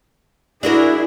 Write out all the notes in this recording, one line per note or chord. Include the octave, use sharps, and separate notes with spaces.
D4 E4 F#4 G#4 A#4